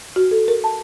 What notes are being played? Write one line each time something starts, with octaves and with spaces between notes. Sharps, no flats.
F#4
A4
A#4
A5